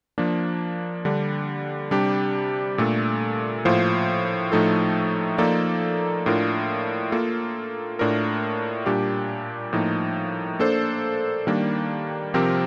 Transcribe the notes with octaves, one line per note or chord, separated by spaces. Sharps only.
F3 A#3 D4
D3 G3 D4
C3 G3 D4 G4
A#2 A3 D4 A4
A2 F3 A#3 F4 C5
A2 F3 A3 D#4 A4
F3 A#3 D#4 A4 D5
A2 A3 D4 F4 A#4
A#3 F4 A4
A2 A3 D4 F4 A#4
A#2 G3 D4 G4
A2 F3 A#3 D#4
A#3 D4 A4 C5
D#3 G3 A#3 D4
C3 F3 C4 G4 A#4